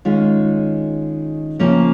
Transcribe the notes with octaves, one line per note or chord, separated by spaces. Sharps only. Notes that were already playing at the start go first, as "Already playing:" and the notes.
D#3 G#3 C#4 F4
C#3 F3 A#3 C#4